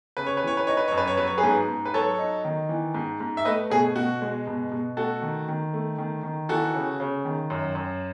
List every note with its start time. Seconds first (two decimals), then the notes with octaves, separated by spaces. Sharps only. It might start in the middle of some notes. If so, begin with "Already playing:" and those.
0.17 C#3 B4
0.26 C#5
0.37 B4
0.43 E3 C#5
0.57 B4
0.67 D#4 C#5
0.77 B4
0.88 F#2 C#5
0.98 B4
1.07 C#5
1.17 F#3 B4
1.27 C#5
1.38 G#4 B4
1.43 G#2
1.68 G#2
1.85 B4
1.93 F#3 A4 C#5
2.18 D#4
2.45 D#3
2.69 E3
2.94 G#2
3.20 G#2
3.37 E5
3.45 A3 B4 D#5
3.70 B2 G#4
3.96 B2 F#4
4.22 G#3
4.47 B2
4.72 B2
4.97 A3 F#4 A4
5.22 D#3
5.49 D#3
5.73 A3
5.98 D#3
6.23 D#3
6.49 E3 F#4 A4
6.75 C#3
7.00 C#3
7.25 D#3
7.50 F#2
7.75 F#2